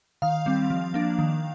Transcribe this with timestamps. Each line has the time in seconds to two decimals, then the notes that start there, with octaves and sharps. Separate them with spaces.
0.22 D#3 F5
0.46 G3 C4
0.70 F3
0.94 A#3 D4
1.19 D#3